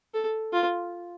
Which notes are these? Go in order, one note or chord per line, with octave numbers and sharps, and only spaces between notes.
A4
F4